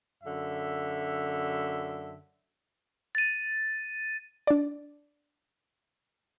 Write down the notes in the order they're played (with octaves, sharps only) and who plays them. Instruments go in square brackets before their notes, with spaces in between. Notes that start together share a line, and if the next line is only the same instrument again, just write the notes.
[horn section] F#2 D3 E5
[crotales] A6 D#7
[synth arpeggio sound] D4 D5